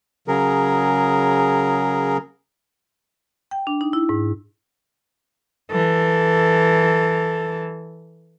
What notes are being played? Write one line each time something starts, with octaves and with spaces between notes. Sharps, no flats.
C#3 F#3 G#4 A#4
G5
D4
D#4
E4
G#2
E3 A4